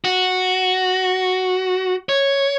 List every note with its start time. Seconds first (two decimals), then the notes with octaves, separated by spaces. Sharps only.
0.04 F#4
2.09 C#5